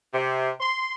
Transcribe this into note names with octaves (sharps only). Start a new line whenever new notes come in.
C3
C6